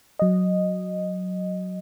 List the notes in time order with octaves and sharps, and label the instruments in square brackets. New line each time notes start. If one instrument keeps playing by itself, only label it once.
[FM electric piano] F#3 D#5